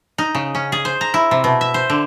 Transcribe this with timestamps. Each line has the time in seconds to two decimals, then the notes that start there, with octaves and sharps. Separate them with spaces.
0.18 D#4
0.35 C#3
0.55 C#4
0.72 G#4
0.85 C5
1.01 A#5
1.14 E4
1.31 C3
1.44 B2
1.61 E5
1.74 C5
1.90 D3